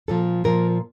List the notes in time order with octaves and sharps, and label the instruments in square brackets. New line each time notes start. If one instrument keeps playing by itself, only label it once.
[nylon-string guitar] A#2 F3 A4
A#2 F3 A#4